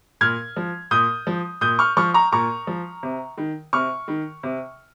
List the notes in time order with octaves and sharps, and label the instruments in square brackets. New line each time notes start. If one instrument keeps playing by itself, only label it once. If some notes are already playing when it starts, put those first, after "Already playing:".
[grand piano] A#2 F6 G#6
F3
A#2 D#6 G6
F3
A#2 D#6 G6
C#6 F6
F3 C#6 F6
A#5 C#6
A#2 A#5 C#6
F3
C3
D#3
C3 C#6 F6
D#3
C3